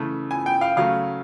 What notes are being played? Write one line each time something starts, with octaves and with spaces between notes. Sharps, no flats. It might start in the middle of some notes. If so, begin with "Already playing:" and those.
Already playing: C#3 E3 A3
G#5
G5
F5
C#3 F#3 A3 F5